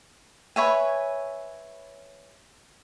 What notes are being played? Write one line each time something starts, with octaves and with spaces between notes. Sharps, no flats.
B4 C#5 E5 G#5